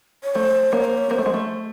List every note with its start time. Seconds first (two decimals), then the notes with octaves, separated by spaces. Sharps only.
0.23 C#5
0.35 A3 C5
0.72 A#3 C#5
0.84 C5
0.98 C#5
1.10 A#3 C5
1.18 A3
1.26 G#3
1.34 A3